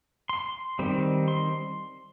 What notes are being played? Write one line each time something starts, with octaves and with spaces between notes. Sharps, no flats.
C6
D#3 G3 C4
C6